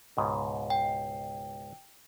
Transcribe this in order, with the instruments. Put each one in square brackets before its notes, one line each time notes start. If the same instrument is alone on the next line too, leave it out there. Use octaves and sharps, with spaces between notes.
[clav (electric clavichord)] C#2 G#2 B2
[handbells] G5